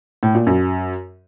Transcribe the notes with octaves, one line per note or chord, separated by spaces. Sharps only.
A2
A#2
F#2